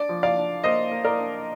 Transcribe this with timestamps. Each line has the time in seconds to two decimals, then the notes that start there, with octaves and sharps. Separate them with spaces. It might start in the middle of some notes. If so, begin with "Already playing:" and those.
Already playing: D4 D5
0.09 F3
0.23 D5 F5
0.37 D4
0.64 A#3 C5 D#5
0.91 A#3
1.05 A#4 D5
1.19 D4